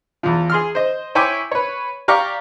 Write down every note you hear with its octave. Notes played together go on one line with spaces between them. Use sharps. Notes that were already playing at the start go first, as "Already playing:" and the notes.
E2 F3
G#4 C6 F6
C5 D#5
E4 C#5 G5 G#5 C6 D6
B4 C#5
G4 D5 F5 A#5 C#6 D6